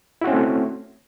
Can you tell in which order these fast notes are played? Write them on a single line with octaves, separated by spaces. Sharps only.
E4 F#4 C#4 C4 A3